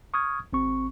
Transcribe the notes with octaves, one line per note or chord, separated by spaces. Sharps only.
C#6 D#6 F6 G#6
G#1 C4 C#6